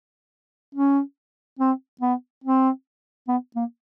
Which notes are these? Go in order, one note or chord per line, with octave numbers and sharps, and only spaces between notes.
C#4
C4
B3
C4
B3
A#3